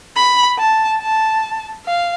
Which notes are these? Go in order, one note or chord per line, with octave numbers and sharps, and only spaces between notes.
B5
A5
A5
F5